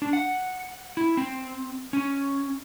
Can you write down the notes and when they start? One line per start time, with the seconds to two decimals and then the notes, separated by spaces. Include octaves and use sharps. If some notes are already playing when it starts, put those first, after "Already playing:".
0.02 D4
0.13 F#5
0.97 E4
1.17 C4
1.93 C#4